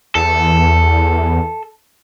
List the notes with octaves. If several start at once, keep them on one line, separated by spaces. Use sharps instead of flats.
E2 A4